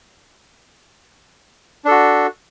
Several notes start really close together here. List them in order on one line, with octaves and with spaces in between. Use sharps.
D4 A4 F#4